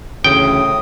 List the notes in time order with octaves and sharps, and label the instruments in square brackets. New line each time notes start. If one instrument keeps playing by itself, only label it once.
[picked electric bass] A1 D2 C#3 [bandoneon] A2 D#6 [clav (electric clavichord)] G5